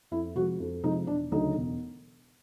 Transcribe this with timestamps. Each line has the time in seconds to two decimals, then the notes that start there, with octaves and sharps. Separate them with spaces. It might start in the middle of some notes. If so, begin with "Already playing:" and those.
0.11 F2 E4
0.35 C3 F3 G#3 F#4
0.60 F2
0.83 C3 F3 G#3 D#4
1.07 E1 D4
1.32 D2 C#3 F#3 D#4
1.55 E1